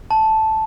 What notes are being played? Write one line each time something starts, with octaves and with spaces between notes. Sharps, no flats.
A5